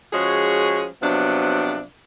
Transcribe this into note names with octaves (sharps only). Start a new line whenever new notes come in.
F3 G#3 C#4 F#4 G#4
C3 F3 F#3 B3 D4